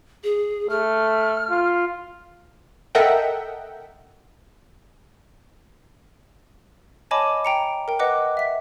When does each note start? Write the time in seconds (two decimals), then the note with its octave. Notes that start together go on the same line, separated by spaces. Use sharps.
0.24 G#4
0.70 A3 F6
1.50 F4
2.95 A4 A#4 D#5 E5 F#5 G5
7.11 C#5 D#5 G#5 A5 B5 D6
7.45 G5 A#5 C#7
7.88 A#4 G5
7.99 B4 D#5 F#5 D6 F#6
8.37 E5 B6